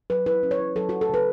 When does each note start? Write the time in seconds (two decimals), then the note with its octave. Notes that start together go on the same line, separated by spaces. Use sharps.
0.10 F#3 B4
0.26 E4 B4
0.43 C#4
0.51 C#5
0.59 E4
0.76 F#3 A4
0.89 F#3 F#4
1.01 A4
1.09 C#3 B4